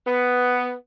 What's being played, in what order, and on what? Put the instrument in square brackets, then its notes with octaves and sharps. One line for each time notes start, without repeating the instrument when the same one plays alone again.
[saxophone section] B3